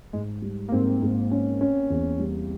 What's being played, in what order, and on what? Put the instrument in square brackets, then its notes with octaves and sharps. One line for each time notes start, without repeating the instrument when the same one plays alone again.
[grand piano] G#2 [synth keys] G#3
[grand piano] G3
[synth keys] A#3
[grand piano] G#2 [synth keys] C4
[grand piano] G#2
C#4
C#4
E2
G3